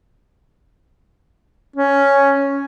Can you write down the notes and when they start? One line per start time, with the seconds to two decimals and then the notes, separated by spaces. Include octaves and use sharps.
1.76 C#4